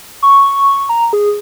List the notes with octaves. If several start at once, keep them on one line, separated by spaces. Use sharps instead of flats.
C#6
A#5
G#4